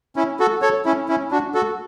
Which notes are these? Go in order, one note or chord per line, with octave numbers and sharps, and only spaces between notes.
C#4 E4
F#4 A4
A4 C#5
C#4 E4
C#4 E4
D4 F#4
F#4 A4